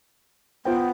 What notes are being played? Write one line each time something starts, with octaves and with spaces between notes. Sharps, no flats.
B3 F4 C5 G5